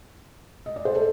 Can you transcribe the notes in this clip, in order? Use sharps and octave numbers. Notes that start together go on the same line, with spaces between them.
D#5
D5
C5
A4